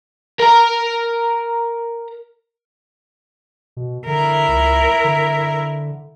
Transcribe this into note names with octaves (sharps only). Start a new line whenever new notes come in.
A#4 A#5
B2
D3 E4 A#4
C#2
D3